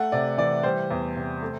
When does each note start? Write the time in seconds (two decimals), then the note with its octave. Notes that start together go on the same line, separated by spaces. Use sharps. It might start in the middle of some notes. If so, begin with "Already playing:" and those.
Already playing: A3 F#5
0.12 C3 D5
0.38 E3 D5
0.63 G3 C5
0.90 E2
1.16 C3
1.42 A3